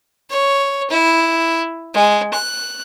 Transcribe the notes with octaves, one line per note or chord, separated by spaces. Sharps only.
C#5
E4
G#3
F#6